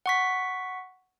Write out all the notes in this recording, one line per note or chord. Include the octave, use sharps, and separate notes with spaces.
F#5 C#6 B6